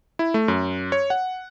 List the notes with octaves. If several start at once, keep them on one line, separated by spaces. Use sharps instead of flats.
E4
A3
F#2
C#5
F#5